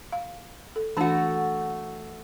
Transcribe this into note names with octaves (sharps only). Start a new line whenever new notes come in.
F5
A4
E3 A3 D4 F#4 A5